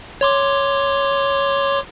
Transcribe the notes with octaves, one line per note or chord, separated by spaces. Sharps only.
C#5 C6 D6